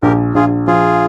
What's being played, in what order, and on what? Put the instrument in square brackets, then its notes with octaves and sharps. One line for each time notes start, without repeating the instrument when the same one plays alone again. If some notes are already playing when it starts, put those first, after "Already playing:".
[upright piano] A#1 [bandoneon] G4 A#4
[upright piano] A#1 [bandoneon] F4 G#4
[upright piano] F3 [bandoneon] F4 G#4